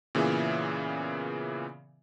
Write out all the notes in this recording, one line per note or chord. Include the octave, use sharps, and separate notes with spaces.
A#2 C#3 E3 B3 G#4 E5